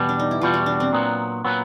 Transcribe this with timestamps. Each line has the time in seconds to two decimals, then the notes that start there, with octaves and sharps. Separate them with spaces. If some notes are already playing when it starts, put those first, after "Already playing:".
Already playing: E2 B2 G3 B3
0.09 D4
0.19 D#4
0.31 E4
0.41 E2 B2 G3 F4
0.54 F#4
0.66 D4
0.80 C4
0.93 A#2 F#3 B3
1.45 A#2 F#3 B3